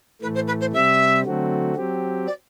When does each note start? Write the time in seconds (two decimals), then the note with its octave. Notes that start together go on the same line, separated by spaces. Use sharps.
0.22 A2 E3 A3 B4
0.35 C5
0.47 B4
0.60 C5
0.72 C3 G3 C4 E5
1.24 D3 F#3 A3 C4 F#4
1.75 F#3 C4 G4
2.27 D5